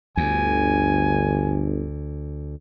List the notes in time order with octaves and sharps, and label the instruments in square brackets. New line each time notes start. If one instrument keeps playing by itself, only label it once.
[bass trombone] G1 [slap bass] D2 [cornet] G#5